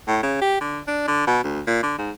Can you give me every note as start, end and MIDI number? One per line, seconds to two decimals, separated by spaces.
0.08 0.19 45
0.23 0.40 49
0.41 0.60 67
0.61 0.80 50
0.87 1.03 62
1.07 1.25 50
1.27 1.42 47
1.44 1.60 38
1.67 1.81 46
1.83 1.95 50
1.98 2.11 44